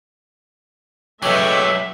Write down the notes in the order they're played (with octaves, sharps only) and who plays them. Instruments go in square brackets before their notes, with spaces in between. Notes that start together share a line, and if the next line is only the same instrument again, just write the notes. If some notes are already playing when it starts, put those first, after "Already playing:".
[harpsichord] B1 C#4 [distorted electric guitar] F#3 G#3 [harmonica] A3 G5 D6 [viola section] E5